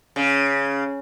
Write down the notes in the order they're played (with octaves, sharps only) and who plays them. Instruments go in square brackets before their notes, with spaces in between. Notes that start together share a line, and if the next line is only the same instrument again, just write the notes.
[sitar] C#3